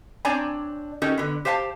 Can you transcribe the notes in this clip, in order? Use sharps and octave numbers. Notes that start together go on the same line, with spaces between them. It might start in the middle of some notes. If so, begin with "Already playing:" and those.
C4 D4 C#5 D5 G#5 A#5
C#4 D#4 F#4 G4 A4 A#4
D3 B3
G4 C5 F5 G#5 A5